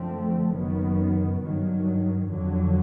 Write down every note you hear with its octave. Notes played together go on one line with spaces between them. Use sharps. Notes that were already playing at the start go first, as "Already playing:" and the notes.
Already playing: F#2 D3 F3 A3 C4
F#1 F#2 D#3 F#3 B3
G2 D#3 F#3
F2 D3 F#3